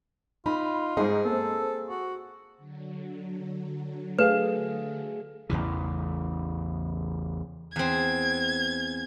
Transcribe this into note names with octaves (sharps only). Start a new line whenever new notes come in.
D#4 F4 B5
G#2 D#4 G#4
A#3 C4 A4
F#4
D3 F#3
A3 G#4 A4 B4 F5
A1 E2 C#3 E3
E2 C4 G#6